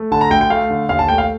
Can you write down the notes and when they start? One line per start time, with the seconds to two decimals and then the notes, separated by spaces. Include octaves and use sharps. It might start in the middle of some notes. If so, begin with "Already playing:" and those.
Already playing: A3
0.11 D3 A5
0.21 A#5
0.31 D2 G5
0.41 G5
0.50 A3 F5
0.70 D3
0.89 D#2 F5
0.99 A5
1.08 A3 G5
1.18 F5